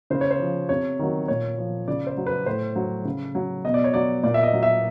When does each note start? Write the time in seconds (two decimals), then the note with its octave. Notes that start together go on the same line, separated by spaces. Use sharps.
0.10 C#3 C5
0.21 C#5
0.31 C5
0.40 F3
0.69 C3 C#5
0.99 D#3 F#3
1.28 A#2 C#5
1.58 F3
1.88 C#3 D5
2.07 C5
2.17 F#3
2.27 B4
2.46 A2 C5
2.76 F#3
3.05 C#3
3.35 F#3
3.65 B2 D#5
3.74 D5
3.84 C#5
3.94 F#3 D5
4.23 A#2 D5
4.34 E5
4.43 D#5
4.53 F#3
4.63 E5